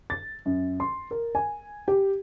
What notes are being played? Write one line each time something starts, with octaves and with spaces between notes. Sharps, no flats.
A6
F#2
C6
A#4
G#5
G4